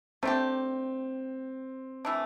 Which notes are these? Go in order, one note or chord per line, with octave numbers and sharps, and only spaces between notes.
A3 C4 D4 G4
E3 A3 D4